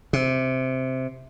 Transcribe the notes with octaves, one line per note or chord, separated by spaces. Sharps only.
C3